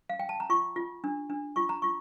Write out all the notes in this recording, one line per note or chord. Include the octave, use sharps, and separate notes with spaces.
F5
G5
A5
A#5
F4 C#6
F4
D4
D4
F4 C#6
A#5
F4 C#6